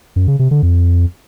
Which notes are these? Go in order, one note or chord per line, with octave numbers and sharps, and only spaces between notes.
F#2
C#3
C3
D3
F2